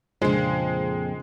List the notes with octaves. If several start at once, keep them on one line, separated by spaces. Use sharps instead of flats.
F2 A#2 C#3 G#3 D4 F4 C5